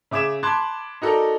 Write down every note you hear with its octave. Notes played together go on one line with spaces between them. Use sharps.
C#3 E5 D6 G#6 E7
A5 B5 C6 D6 F#6 G#6
D#4 F#4 A4 A#4 D5